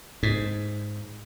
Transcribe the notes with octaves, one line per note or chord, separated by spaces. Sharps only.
G#2